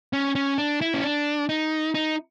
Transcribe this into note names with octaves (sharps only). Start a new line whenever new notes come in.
C#4
C#4
D4
E4
C#4
D4
D#4
D#4